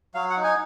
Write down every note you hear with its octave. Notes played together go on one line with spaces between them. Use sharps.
F#3 F5
F#5
D#4
G#5